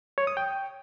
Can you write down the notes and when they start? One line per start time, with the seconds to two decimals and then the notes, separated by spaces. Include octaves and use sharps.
0.18 C#5
0.27 D#6
0.37 G5